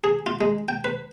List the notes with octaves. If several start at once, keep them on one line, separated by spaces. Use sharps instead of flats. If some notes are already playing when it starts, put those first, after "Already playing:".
G#4
F4
G#3
G5
B4